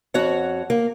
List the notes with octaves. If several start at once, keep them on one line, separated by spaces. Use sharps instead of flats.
F2 F#4 C#5 F#5
A#3